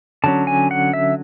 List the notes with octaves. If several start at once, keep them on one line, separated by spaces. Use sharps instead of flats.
D3 F#3 C#4 A5
G#5
F#5
E5